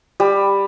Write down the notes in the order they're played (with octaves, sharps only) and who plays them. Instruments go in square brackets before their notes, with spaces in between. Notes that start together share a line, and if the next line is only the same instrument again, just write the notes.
[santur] G3